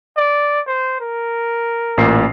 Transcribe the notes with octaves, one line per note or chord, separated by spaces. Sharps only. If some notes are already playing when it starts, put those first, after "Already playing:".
D5
C5
A#4
A1 A#2 C7